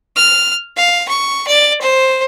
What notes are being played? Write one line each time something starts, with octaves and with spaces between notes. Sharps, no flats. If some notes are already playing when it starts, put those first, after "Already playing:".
F6
F5
C#6
D5
C5